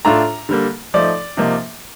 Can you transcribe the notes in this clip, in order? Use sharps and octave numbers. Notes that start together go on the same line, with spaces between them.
A2 A3 D4 F4 A#5
D3 G3 A#3
F3 A3 D#4 D5
C3 F3 A#3 D#4